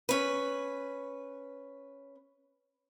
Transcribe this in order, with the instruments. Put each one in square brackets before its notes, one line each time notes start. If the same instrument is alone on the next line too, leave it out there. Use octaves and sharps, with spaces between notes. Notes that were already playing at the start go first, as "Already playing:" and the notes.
[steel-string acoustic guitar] C#4 B4